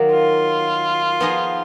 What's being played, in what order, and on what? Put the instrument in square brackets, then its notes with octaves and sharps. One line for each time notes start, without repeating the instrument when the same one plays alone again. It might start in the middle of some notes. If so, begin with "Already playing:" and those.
Already playing: [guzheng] D#3 F#3 A#3
[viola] F4
[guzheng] F3 B3 D#4 G#4 D#5